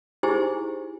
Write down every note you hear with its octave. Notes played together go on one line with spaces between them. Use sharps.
D#4 E4 G4 G#4 C5 G#5